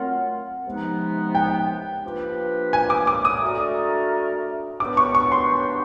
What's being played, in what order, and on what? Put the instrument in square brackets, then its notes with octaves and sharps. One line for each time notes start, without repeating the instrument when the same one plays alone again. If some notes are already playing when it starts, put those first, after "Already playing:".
Already playing: [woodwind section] F#3 A3 C4 F4 A#4 [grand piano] F#5
[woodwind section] C3 F3 G#3 B3 D#4
[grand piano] G5
[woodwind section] F3 A#3 D4 G4 B4
[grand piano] G#5
D6
D6
D#6
[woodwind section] A3 D4 F#4 A#4 D5
[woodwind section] F#3 B3 D4 G4 B4 [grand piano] D6
[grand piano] C#6
C#6
C6